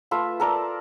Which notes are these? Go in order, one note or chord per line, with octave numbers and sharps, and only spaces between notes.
A3 F4 B4 E5
A4 A#4 D5